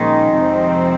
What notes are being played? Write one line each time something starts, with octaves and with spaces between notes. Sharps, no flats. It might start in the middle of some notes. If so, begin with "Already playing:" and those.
Already playing: A#2 D#3 F3 G#3 A#3 C#4
F2 C3 F3 C4